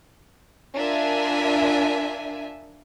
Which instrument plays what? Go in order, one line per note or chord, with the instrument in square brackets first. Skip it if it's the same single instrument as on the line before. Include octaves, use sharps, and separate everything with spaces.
[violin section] D4 F4 A#4 E5 G#5